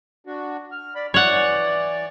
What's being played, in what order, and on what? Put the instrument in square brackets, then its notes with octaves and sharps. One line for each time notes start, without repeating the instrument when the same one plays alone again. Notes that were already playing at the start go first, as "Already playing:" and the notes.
[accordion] D4 F#4
F6
D5 B5
[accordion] E3 D5 [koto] C#5 F#5